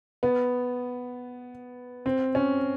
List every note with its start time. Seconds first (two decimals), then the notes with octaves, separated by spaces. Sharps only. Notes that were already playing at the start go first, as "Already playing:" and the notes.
0.23 B3
2.06 C4
2.35 C#4